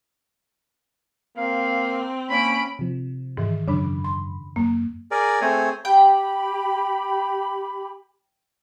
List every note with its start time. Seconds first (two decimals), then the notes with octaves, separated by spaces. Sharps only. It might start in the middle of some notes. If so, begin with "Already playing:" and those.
1.37 A#3 C4 F5
2.30 A#3 C#4 B5 D7
2.79 C3 F3
3.37 G#2 D#3 E3
3.68 F#2 C#3 D4 B5
4.04 C6
4.56 F#2 A#3
5.11 G#4 A#4 D5
5.41 A3 C4 G#4 C#5
5.85 G4 G5 B5